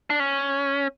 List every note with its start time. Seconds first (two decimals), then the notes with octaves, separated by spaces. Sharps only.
0.10 D4
0.20 C#4